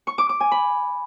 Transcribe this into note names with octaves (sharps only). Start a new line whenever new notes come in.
C#6
D6
D6
G#5
B5